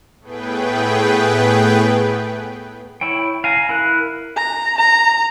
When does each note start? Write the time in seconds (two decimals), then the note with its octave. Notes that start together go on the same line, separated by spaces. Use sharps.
0.21 A2 A3 B3 G#4 B4 G5
3.01 E4 C#5 G5
3.44 F5 G#5 A#5
3.69 E4 A#4 F#6
4.36 A#5
4.78 A#5